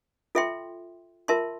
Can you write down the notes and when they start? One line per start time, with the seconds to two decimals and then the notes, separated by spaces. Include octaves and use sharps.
0.35 F4 A4 E5 G5 C6
1.28 F4 A#4 E5 A5 C6